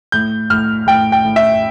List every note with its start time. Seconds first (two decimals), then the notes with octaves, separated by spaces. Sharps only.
0.12 A2 G6
0.50 A2 F6
0.87 A2 G5
1.12 G5
1.25 A2
1.36 E5